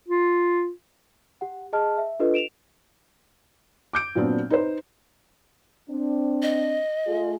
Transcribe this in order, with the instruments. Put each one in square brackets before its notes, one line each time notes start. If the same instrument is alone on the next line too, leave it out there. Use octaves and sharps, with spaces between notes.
[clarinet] F4
[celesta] G4 F#5
G#4 D#5 A5 F6
E5
D4 F4 G4 A4 B4 D#5
D7 E7 F7
[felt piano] D6 G6 D7
A#2 F#3 B3 C4 D4
D#4 B4 C5
[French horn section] C4 D4
[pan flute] D#5
[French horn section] A3 F4 G#4